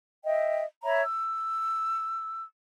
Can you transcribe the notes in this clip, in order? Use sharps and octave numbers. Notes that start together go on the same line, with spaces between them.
D#5 E5 G5
C#5 E5 A#5 B5
E6